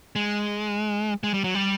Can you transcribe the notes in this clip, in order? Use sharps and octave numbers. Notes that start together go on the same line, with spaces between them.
G#3
G#3
G3
F#3
G3